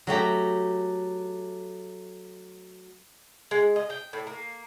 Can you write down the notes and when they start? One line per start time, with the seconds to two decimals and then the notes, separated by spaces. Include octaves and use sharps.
0.07 F#3 A3 G4 A#5
3.51 G#3
3.76 D#5
3.90 G5
4.13 A2
4.27 A#3